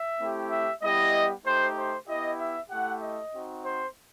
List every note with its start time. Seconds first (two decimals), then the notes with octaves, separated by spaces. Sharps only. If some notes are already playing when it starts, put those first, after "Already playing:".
Already playing: E5
0.19 A3 C4 E4 G4
0.51 E5
0.82 G3 B3 E4 G4 D#5
1.45 A3 D#4 G4 C5
1.76 C5
2.08 B3 E4 G4 D#5
2.39 E5
2.70 A3 E4 G4 F#5
3.02 D#5
3.34 C4 D#4 F#4
3.65 C5